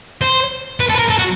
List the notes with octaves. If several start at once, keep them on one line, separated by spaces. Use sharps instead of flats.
C5
B4
A4
B4
A#4
A4
F#4